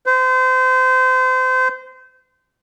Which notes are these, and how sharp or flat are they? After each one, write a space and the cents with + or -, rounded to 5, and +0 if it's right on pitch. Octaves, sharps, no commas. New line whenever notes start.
C5 -30